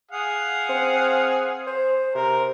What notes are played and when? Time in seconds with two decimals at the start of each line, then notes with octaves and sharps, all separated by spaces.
0.11 G#4 F5 F#5
0.69 C4
1.67 C5
2.15 C3 A#4